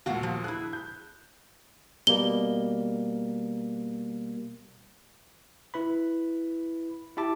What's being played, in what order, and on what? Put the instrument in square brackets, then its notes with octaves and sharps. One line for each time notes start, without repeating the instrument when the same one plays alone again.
[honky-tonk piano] D#2 A#2 [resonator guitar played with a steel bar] F#4 F5 F#5
[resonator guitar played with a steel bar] F3
[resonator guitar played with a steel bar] E4 G#4 [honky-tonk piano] F#6
[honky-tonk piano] G6
[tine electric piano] B2 G3 A#3 [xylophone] G7
[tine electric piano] E4 B4 B5
E4 G4 E5 A5 D6